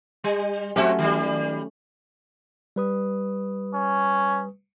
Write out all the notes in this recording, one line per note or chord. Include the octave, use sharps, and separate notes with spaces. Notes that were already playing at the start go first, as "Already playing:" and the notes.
G3
F#3 A3 C4 C#4 F#4 G4
D#3 G3
G3 B4 D#6
C#4